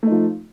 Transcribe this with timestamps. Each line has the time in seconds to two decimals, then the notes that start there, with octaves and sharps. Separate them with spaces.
0.03 A3
0.07 D#4
0.11 F3